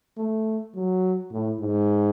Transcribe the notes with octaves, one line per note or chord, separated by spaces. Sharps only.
A3
F#3
A2
G#2